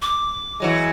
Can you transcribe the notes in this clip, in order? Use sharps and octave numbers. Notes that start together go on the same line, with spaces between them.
D6
E3 F#3 G#3